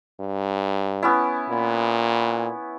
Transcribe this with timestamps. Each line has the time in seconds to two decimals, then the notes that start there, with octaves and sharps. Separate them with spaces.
0.20 G2
1.03 B3 C#4 E4
1.50 A#2